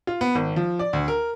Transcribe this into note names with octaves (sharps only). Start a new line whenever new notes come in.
F4
B3
G#1
F3
D5
D2
A#4